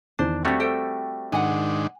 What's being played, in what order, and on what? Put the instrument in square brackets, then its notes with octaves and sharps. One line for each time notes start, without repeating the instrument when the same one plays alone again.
[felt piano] E2 D#3 [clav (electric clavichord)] D4 [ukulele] C5
[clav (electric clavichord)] G3 A3 F#4 [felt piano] C4 [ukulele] D4 C#5
[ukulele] A4 C5 G5
[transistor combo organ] G#2 D#3 D4 [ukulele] F#5 G#5